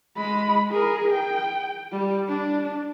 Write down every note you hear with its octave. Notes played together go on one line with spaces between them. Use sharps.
G#3 B5
G#4 A#4
G5
G3
D4